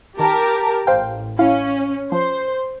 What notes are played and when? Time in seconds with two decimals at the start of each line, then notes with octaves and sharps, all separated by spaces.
0.19 D#3 G4 A#4 A5
0.87 A1 C5 F5 G5
1.39 C#4 E4 F5
2.12 F3 C5